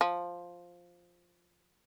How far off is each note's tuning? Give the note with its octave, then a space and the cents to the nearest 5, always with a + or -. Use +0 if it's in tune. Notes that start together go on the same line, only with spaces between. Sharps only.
F3 +5